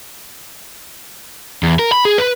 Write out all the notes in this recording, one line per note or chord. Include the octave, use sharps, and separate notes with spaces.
E2
A#4
B5
G#4
B4